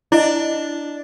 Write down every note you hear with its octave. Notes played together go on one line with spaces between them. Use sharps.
D4 E4 D#5